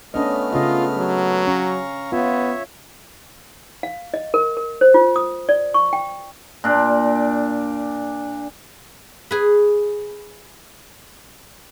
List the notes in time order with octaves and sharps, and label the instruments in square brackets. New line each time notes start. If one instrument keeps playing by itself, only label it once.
[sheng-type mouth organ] A3 B3 F6 [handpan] C#4 D4 D#5
[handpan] C#3 D#5 [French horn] F4
[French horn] F#3
[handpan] C#4 [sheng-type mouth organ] F5 A#5 C#6
[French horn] B3 [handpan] F4 [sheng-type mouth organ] C#5 E5
[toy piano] F5
D#5
A#4
A#4
C5
F4
D#6
D5
C#6
G5
[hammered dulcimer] A#2 D4
[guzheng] G#4 B4